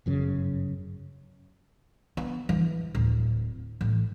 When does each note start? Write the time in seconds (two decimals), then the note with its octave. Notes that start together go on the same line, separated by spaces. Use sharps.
0.06 G1 F#2 C#3
2.17 B3
2.49 E3
2.95 D1
3.81 A1